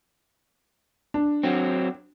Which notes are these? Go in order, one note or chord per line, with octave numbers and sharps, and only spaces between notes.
D4
F#3 C4